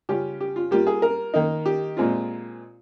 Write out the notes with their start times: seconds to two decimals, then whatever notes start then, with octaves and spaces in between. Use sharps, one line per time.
0.09 C#3 G3 C#4 F4 G4
0.41 G4
0.56 F4
0.71 G3 A#3 F4 G4
0.87 G#4
1.02 A#4
1.34 D#3 A#3 D#4
1.66 G4
1.97 A#2 G#3 C4 F4